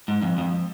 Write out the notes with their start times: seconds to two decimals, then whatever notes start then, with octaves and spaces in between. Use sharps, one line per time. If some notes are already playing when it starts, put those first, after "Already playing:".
0.08 G#2
0.22 F2
0.38 F2